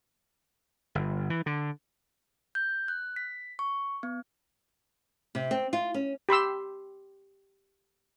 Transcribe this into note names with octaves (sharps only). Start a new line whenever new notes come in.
G1
E3
D3
G6
F#6
B6
C#6
B3
C3
C4
F4
C#4
G4 B5 C6 E6